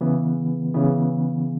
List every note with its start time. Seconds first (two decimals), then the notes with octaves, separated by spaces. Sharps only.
0.01 C#3 E3 B3
0.74 C#3 E3 B3